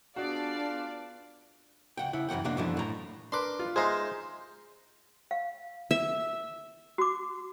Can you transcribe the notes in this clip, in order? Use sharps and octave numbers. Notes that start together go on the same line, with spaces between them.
B3 D4 F4 F#4 G#4 D5 F5
C#2 F#5 G5
C#3 E4 F#5
F#2 E3 A#3 F#5 G5
B1 C3 A#3 D4 D5 F#5
F#2 B2 D3 E3 F3
A2 A#5
D4 A#4 B4 C6 D6
F4
G#3 D#4 G#4 C5 E5 F5 A#5 C6
F5
E5
F#4 D6